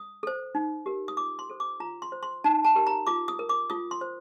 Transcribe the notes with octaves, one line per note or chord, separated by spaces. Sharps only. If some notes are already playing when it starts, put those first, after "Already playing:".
Already playing: D#6
A4 C5
D#4
G4 A#4
D#6
F4 D6
C6
A4 C5
D6
F4 A#5
C6
C5
C6
D#4 A5
A5
G4 A#4
A#5
F4 D6
D#6
A#4
D6
F4 D#6
C6
C5